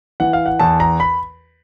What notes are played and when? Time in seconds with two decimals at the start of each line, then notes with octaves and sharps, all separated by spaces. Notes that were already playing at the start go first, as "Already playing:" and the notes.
0.20 E3 F#5
0.33 F5
0.46 F#5
0.59 E2 A5
0.80 A#5
1.00 B5